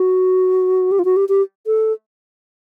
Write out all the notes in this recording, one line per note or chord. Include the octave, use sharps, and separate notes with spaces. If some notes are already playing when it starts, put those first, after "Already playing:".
Already playing: F#4
G4
F4
F#4
G4
G4
A4